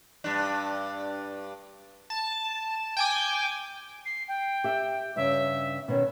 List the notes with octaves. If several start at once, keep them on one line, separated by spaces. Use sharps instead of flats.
G2 D4
A5
G5 G#5 D6
C7
G5
G4 E5
G2 C#3 E5
B2 D#3 C#4